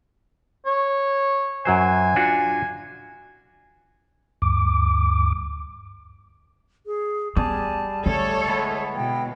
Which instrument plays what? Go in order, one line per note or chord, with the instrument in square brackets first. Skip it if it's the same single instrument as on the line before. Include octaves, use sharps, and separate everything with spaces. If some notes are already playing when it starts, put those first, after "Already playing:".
[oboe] C#5
[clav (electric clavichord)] F#2 F#3 C5 [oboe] G#5
[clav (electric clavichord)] D4 F4 F#4
[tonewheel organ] D2 G2 D6
[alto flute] G#4
[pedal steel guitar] G3 G#4 [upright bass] B3 [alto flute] A5
[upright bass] D3 [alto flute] A3 [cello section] A4 C#5
[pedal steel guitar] G#3 B3 E4
[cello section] B2 [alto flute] G5